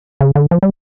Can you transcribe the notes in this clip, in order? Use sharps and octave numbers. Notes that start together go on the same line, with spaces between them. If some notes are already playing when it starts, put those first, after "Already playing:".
C#3
D3
F3
G3